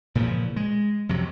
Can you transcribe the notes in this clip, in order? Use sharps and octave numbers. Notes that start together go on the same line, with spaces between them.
A#2 C#3 E3 F3
G#3
F2 C3 F#3